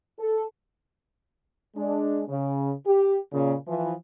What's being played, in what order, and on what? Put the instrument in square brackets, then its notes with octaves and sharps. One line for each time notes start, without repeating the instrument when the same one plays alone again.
[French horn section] A4
G#3 D4
C#3
G4
A#2 C#3
E3 F3